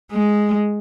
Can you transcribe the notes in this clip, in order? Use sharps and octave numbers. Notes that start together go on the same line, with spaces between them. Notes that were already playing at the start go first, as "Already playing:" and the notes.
G#3